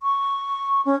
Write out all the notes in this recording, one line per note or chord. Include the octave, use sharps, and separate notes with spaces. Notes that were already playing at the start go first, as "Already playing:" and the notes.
C#6
C#4